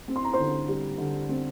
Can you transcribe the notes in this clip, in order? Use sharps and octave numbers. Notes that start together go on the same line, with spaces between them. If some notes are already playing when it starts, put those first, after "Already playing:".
C4
C6
A#5
D3 C5 C6
G3
D3
C4